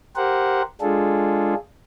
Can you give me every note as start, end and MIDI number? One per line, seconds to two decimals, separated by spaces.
0.16 0.62 67
0.16 0.62 70
0.16 0.62 72
0.16 0.62 78
0.81 1.54 56
0.81 1.54 62
0.81 1.54 65
0.81 1.54 68
0.81 1.54 69